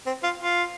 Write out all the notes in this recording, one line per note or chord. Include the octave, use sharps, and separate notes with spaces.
C4
F4
F4